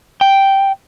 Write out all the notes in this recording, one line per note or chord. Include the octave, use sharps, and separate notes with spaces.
G5